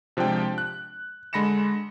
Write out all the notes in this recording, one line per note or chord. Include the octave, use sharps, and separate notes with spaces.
C3 F3 G#3 D4 G5
F#6
D3 G#3 B5 A#6 C#7 E7